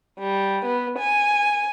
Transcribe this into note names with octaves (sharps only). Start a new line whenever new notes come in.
G3
B3
G#5